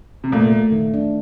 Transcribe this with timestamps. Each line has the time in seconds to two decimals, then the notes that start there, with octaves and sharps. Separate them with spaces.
0.24 C3
0.32 A#2 A3
0.52 A3
0.72 D#3
0.94 D4